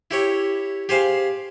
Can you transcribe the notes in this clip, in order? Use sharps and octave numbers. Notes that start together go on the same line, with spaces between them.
E4 G4 C#5
G4 G#4 C5 F5